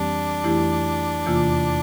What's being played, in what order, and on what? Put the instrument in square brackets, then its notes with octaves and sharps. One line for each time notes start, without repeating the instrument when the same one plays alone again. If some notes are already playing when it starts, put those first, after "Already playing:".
Already playing: [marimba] F2 E3 G3 C4 G4 [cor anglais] D4
[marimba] F2 E3 A3 E4 G4
E2 C3 E3 A#3 F4